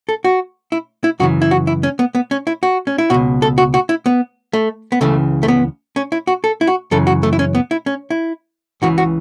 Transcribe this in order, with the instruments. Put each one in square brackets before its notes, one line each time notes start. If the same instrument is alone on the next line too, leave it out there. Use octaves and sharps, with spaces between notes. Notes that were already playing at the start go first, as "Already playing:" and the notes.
[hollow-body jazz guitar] A4
F#4
E4
E4
F#2 C#3 E3 F#4
E4
F#4
E4
C#4
B3
B3
C#4
E4
F#4
C#4
E4
C#2 B2 F#4
A4
F#4
F#4
E4
B3
A3
B3
C#2 C#3 E3 A3
A3
B3
C#4
E4
F#4
A4
E4
F#4
F#2 C#3 E3 A4
F#4
A3
E4
C#4
B3
E4
C#4
E4
C#2 C#3 E3 F#4
F#4